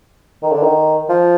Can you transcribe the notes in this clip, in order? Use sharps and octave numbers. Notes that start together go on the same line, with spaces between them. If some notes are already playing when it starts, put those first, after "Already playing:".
D#3
D3
D#3
F3